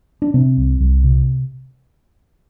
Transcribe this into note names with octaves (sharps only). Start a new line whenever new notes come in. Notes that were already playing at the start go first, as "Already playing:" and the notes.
D4
C3 C4
C2
C2
C3